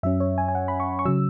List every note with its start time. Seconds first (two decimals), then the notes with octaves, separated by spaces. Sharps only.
0.03 F#2 F#3 C#4 E5
0.20 C#5
0.38 G#5
0.48 G#5
0.55 F#5
0.68 B5
0.80 C#6
0.99 C#6
1.05 C#3 F#3 E6